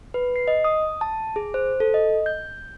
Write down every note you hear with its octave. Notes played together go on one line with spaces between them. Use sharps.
B4
C7
D#5
D#6
A5
G#4
C5
A4
D#5
G6